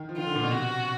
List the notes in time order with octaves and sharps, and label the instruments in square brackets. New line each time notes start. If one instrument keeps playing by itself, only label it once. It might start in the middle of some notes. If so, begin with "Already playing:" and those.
Already playing: [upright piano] D#3
F3
[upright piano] D#3 [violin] F4
[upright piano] D3
A#2
B2
[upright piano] C3 [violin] F#4